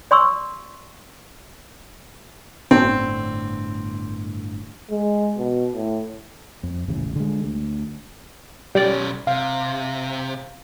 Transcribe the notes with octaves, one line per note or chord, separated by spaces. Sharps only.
D5 C6 C#6 E6
G1 A2 D3 C4
G#3
B2
A2
F2
D#1 A1 C#3
D3 G#3
D2
B1 G3 C#4 D5
C3 F5